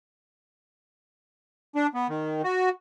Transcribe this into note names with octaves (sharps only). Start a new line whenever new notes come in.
D4
B3
D#3
F#4